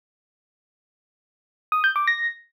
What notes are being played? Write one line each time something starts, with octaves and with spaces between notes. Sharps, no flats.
D#6
G6
D6
A#6